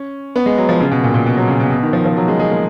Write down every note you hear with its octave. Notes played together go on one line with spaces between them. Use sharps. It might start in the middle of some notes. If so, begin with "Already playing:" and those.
Already playing: C#4
B3
G#3
F#3
F3
C#3
B2
A#2
A#2
B2
F#3
C#3
B2
B2
D#3
F3
F3
F#3
G#3
G#3
A#3